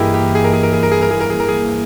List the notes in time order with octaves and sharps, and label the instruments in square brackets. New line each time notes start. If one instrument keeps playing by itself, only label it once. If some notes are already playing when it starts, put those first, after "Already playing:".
Already playing: [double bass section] G2 E3 A#3 [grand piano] E4 G4 G#4 A#4 D#5
[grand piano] G4
G#4
A#4
G#4
A#4
G#4
A#4
G#4
A#4
G#4
A#4
G#4
A#4
G#4